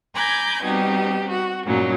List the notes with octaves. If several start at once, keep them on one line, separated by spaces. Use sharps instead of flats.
G#5 A#5 B5 D6 G6 G#6
B2 G3 C4 D#4 G4
F#4
G2 A#2 C#3 F#3 D#4